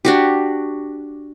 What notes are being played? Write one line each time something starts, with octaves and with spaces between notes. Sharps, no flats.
D4 F#4 G4